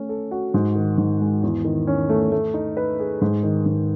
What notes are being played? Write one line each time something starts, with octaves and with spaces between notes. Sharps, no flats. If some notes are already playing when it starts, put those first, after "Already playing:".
Already playing: A3 C#4
A4
F#4
G#2
D#3
G#2
G#3
E2
D#3
C#4
A3
A3
D#4
B4
G#4
G#2
D#3
G#2